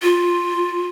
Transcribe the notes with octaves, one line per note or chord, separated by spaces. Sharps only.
F4